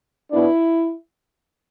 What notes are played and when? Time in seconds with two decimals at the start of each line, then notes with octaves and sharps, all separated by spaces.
0.31 B2 B3 D4 E4